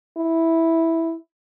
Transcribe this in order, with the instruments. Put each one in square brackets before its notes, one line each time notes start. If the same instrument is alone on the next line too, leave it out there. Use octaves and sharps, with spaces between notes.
[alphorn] E4